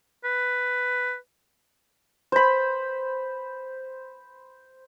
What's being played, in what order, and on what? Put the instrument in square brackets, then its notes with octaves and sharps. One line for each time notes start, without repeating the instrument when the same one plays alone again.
[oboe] B4
[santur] C5 B5